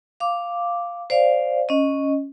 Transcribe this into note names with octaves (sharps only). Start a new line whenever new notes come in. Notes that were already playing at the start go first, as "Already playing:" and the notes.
F5 D6
C5 D5 F5
C#4 D#5